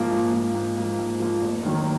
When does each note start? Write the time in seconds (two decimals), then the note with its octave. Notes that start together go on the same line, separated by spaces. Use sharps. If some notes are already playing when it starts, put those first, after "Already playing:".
Already playing: G#2 F3 A#3
0.11 G#2
0.33 F3 A#3
0.55 G#2
0.77 F3 A#3
0.99 G#2
1.20 F3 A#3
1.42 F1
1.63 D#2 D#3 F#3